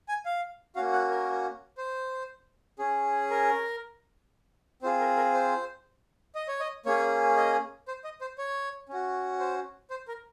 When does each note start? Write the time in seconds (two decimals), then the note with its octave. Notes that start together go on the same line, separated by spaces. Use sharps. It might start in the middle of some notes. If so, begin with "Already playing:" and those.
0.09 G#5
0.26 F5
0.76 A#3 C#4 F#4 F5
0.93 F#5
1.09 A#4
1.77 C5
2.79 C#4 G#4
3.30 A#4
4.82 C4 F4 G#4 C5
5.00 A#4
5.17 A#4
5.34 C5
6.35 D#5
6.48 C#5
6.60 D#5
6.86 A#3 C#4 G#4 C#5
7.37 D#5
7.88 C5
8.04 D#5
8.21 C5
8.38 C#5
8.89 C#4 F#4
9.39 C5
9.90 C5
10.08 A#4